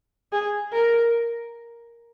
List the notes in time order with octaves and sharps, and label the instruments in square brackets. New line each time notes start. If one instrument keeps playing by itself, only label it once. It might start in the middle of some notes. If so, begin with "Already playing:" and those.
[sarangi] G#4
A#4